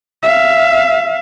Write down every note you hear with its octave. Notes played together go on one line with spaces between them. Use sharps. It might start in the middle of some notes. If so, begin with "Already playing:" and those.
E5 F5